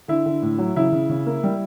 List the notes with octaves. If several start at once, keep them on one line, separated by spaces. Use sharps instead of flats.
D3 E4
D3
A2
F#3
C#3 E4
C#3
C#3
A#3
G3